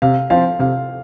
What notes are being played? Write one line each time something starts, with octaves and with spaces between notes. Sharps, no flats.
C3 F5
F3 C4 F5
C3 F5